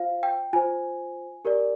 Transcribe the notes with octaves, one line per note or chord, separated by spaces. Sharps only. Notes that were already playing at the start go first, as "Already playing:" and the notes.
Already playing: F4 C5 F5
G5
F4 C5 G#5
G4 A#4 D5